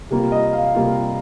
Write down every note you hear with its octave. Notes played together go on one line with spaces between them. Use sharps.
C3 G3 A#3 F4
D#5
F5
C3 G3 A#3 F4